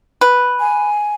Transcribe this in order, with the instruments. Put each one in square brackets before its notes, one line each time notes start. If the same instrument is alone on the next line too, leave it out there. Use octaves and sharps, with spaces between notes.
[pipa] B4
[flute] G#5